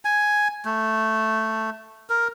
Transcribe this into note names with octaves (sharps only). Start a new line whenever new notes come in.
G#5
A3
A#4